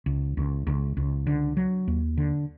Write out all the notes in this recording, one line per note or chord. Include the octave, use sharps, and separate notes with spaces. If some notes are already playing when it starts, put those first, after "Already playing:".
C#2
C#2
C#2
C#2
D3
F#3
D#2
D3